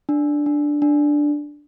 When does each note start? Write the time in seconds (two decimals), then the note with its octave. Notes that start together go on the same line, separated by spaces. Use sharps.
0.09 D4
0.46 D4
0.82 D4